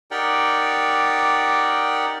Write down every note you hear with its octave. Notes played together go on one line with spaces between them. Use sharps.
D#4 G4 A#4 D5 F#5 G5